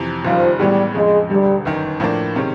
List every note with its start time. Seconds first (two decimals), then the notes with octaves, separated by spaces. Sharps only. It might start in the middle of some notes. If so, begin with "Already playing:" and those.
Already playing: F2 C3 E3
0.25 F#1 F#2 D#3 F3 G3
0.60 A2 E3 G3 G#3 B3
0.95 F2 C#3 F3 G#3
1.30 E1 D2 D3 G3
1.65 G1 F#2 D#3
2.00 A2 F3 A#3 D4
2.36 C3 D#3 G#3 C#4